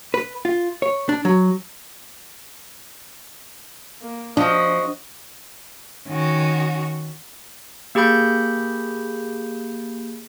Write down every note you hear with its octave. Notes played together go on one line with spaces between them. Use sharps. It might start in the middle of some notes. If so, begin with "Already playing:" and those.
B4
F4
C#5
D4
F#3
A#3
F3 D4 F#4 D#5
D#3 C#4 F#4
A#3 G4 G#4 B5 G6